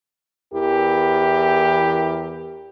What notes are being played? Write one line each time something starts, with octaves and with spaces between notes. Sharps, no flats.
E2 E3 G4 A#4